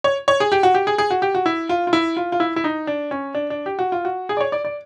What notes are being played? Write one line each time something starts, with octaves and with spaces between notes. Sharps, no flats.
C#5
C#5
G#4
G4
F#4
G4
G#4
G#4
F#4
G4
F#4
E4
F4
F4
E4
F4
F4
E4
E4
D#4
D4
C#4
D4
D4
G4
F#4
F4
F#4
G#4
D5
C#5
D5
D5